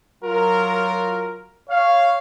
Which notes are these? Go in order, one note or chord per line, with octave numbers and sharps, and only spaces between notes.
F#3 F4 A#4
C#5 F5